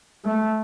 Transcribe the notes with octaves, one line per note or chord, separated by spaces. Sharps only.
A3